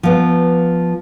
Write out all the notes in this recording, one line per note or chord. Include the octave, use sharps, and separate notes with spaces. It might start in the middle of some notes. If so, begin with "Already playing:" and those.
F3 B3